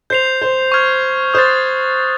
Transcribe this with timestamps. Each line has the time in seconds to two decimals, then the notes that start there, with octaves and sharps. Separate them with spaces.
0.10 C5 G6 C7 F7
0.42 C5
0.72 C#6 F6 G#6
1.34 C5 D#6 F#6 A6